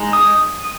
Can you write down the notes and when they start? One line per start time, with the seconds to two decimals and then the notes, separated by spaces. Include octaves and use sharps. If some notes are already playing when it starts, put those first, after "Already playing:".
Already playing: G#3 D#4
0.13 D#6